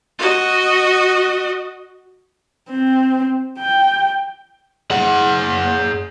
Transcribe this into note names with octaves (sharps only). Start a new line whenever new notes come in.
F#4 D#5
C4
G5
G#4 F#5